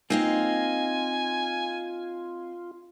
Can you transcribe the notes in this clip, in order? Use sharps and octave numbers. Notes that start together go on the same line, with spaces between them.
A#3 C4 D#4 F4 D#5 F5 G#5